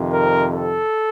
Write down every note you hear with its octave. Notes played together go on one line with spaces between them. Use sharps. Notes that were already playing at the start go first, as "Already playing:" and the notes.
Already playing: F2 C3 D#3
A#4
A4